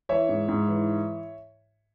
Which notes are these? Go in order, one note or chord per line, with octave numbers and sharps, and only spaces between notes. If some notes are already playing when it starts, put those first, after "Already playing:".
E3 C#5 E5
G#2
G#2
E3